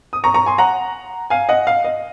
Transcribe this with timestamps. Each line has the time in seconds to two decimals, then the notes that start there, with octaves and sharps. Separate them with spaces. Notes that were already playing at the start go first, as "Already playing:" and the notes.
0.13 D#6
0.24 A#5 C#6
0.34 A#5 C#6
0.46 G#5 C6
0.58 F#5 A#5
1.30 F5 G#5
1.49 D#5 F#5
1.67 F5
1.84 D#5